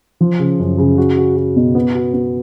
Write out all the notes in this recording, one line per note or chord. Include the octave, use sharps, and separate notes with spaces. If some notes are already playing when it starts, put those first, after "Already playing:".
F3
C#3
F#2
C#3
F#4
F#4
F#4
B2
B3
F#4
B3